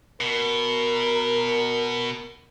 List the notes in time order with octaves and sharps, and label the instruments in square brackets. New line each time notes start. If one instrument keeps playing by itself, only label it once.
[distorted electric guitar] B2 [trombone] A#4